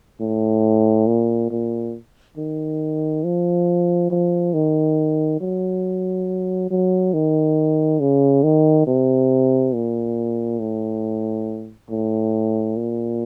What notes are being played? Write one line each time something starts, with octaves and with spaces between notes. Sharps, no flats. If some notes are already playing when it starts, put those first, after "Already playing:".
A2
A#2
A#2
D#3
F3
F3
D#3
F#3
F#3
D#3
C#3
D#3
C3
A#2
A2
A2
A#2